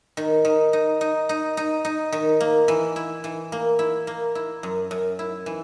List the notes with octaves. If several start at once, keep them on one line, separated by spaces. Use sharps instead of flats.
D#3
D#3
D#4
D#4
D#4
D#4
D#4
D#3
A#3
E3
E4
E3
A#3
E4
A#3
E4
F#2
F#2
E4
E3